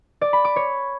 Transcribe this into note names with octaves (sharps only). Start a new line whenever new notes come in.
D5
B5
D6
C#5